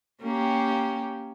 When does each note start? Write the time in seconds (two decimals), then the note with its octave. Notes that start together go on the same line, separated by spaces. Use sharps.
0.22 A#3 C#4 G4